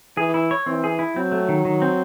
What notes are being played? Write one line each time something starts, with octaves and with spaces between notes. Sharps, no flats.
E3 G#4
E4
C#5
E3 C4
G#4
E4
F#3 C4
A3
D#3
D#3
C4